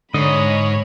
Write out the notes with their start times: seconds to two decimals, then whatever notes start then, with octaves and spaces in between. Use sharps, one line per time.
0.14 G#2 D3 C#5 D#5 B5